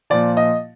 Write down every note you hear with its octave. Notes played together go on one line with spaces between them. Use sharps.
A#2 F3 D5
D#5